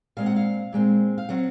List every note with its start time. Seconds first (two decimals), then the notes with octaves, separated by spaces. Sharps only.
0.17 A#2 G#3 C4 F5
0.26 F#5
0.36 F5
0.72 A#2 G#3 C4
1.18 F5
1.29 F#3 C4 F#5